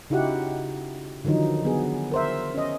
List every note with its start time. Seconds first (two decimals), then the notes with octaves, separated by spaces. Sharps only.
0.10 C#3 D#4 E4 F#4 G4 F#5
1.25 D3 D#3 F3 F#3 D#4
1.64 F#3 B3 G#4
2.11 A#4 C5 E5
2.54 C#4 D#5